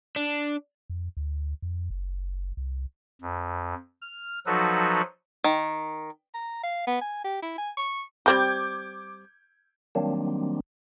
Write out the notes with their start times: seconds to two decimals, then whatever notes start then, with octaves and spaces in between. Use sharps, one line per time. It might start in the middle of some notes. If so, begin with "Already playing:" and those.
0.16 D4
0.90 F2
1.17 D2
1.62 F2
1.90 F#1
2.57 C2
3.22 F2
4.01 F6
4.46 F3 F#3 D#4 F#4 A4 B4
5.44 D#3
6.34 A#5
6.64 F5
6.87 B3
7.02 G#5
7.24 G4
7.42 E4
7.58 G#5
7.77 C#6
8.26 G3 C4 G4 D6 G6 G#6
9.95 D#3 F#3 G3 A#3 C4 D4